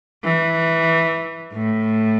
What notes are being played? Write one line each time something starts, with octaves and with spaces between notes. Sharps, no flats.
E3
A2